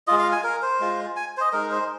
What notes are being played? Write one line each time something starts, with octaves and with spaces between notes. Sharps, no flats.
G#3 F4 D#5
F5
G#5
A#4
C5
G#3 F4
G#5
C5
D#5
G#3 D#4 A#4
C5